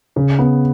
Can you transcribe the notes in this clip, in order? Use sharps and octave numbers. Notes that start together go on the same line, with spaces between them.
C#3
B3